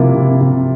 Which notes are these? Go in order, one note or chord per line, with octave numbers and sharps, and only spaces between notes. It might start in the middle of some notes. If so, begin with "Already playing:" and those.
Already playing: C3 F3 A#3 E4 F4
C3
C3